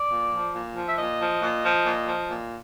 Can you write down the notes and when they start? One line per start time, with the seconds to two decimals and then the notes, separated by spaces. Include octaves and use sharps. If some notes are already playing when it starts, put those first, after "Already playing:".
Already playing: D5
0.09 A#2
0.31 F3
0.53 A#2
0.75 F3
0.87 E5
0.97 A#2 D#5
1.19 F3
1.41 A#2
1.63 F3
1.84 A#2
2.06 F3
2.28 A#2